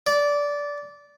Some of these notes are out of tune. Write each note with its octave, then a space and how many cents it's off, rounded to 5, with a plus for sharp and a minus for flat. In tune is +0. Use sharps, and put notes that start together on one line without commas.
D5 -15